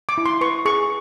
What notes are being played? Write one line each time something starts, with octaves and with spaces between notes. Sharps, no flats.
D6
E4
C6
B4 C#6
G#4 C#6